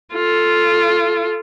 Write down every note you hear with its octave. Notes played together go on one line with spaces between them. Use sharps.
F4 A4